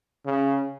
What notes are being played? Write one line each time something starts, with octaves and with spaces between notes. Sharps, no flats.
C#3